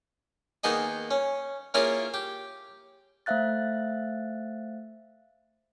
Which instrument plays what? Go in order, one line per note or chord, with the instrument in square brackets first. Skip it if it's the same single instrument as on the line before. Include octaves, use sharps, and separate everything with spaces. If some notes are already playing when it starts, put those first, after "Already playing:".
[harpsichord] D#3 A#3 B3 D#4 G#4 D#5
C#4
A#3 C#4 E4 F4 G#4 A#4
G4
[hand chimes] A3 C5 E5 F5 F#6 A6